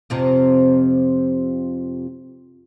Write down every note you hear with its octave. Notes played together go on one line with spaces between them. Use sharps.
F2 C3 F3